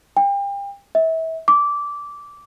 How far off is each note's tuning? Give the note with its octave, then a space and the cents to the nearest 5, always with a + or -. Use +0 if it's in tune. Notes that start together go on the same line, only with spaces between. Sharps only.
G5 +35
E5 -30
D6 -15